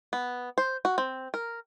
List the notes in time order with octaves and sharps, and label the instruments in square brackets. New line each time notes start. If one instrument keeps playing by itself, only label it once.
[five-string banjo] B3
C5
F#4
C4
A#4